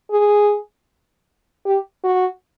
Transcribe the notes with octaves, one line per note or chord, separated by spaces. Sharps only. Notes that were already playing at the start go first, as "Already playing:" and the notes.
G#4
G4
F#4